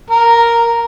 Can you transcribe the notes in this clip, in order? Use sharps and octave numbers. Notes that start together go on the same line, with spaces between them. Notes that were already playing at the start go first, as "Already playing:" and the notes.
A#4